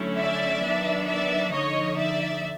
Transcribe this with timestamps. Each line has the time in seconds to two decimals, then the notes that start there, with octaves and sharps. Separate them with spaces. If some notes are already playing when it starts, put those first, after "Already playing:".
Already playing: D3 F#3 A3 C#4 E4
0.16 D5 E5
0.62 D#3 F#3 B3 D4
1.07 D5 E5
1.52 D3 F3 A#3 D#4 C#5 D#5
1.97 D5 E5